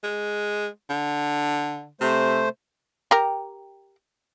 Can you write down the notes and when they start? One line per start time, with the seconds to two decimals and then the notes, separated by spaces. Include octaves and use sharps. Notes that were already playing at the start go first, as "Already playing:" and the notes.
0.04 G#3
0.90 D3
2.01 C3 A3 C5
3.11 G4 A#4